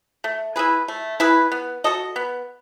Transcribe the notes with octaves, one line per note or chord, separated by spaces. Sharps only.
A3
E4 G#4 B4
A3
E4 G#4 B4
B3
F#4 A4 D#5
B3